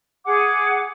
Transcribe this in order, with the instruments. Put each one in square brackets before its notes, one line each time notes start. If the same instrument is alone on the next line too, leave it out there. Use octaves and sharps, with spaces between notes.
[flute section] G#4 F#5 D6